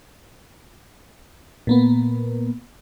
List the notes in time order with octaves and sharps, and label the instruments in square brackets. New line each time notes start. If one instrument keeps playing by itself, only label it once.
[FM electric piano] A#2 A#3 B3